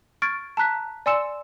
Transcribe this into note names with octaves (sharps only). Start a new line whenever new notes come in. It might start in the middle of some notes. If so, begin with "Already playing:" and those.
C#6 F6 G#6 A6 D7
A5 A#5 F#6 B6
D5 G#5 C6 E6 C#7 E7